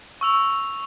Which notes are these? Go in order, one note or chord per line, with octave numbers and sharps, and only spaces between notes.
C#6 E6 F7